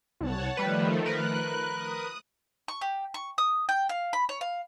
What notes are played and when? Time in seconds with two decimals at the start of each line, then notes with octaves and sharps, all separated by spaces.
0.21 C2 C#5 F#5 A5
0.57 D#3 F3 G3 A3 B4
1.06 A#4 B4 F#6
1.74 D#6
2.68 C#6
2.81 G4
3.14 C#6
3.38 D#6
3.69 G5
3.89 F5
4.13 B5
4.29 C#5
4.41 F5